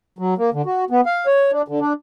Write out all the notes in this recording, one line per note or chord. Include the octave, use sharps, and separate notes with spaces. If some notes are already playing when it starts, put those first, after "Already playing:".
F#3
A#3
D3
F#4
B3
F5
C#5
D4
D3
D4